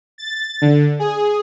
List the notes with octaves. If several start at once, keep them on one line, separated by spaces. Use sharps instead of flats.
A6
D3
G#4